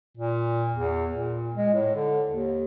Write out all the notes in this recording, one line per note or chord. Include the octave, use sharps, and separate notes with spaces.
A#2
E2
A#2
G#3
A2
D3
D#2